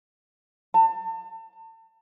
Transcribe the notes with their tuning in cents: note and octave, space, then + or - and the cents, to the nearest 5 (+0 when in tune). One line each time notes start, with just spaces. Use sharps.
A5 +35